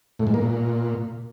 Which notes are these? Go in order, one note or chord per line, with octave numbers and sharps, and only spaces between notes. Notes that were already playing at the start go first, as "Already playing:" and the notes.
A2
G#2
A#3
A#2